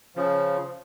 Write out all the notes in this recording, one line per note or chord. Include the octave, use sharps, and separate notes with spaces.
C#3 F3